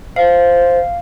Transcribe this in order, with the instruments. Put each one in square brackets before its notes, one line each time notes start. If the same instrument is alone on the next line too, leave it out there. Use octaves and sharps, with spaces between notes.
[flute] C5 [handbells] F5